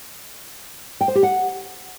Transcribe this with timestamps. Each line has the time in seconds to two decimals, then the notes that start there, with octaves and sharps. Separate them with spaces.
1.01 G5
1.08 C5
1.15 G4
1.23 F#5